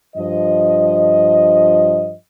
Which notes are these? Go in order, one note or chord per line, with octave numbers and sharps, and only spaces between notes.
G2 F3 D#5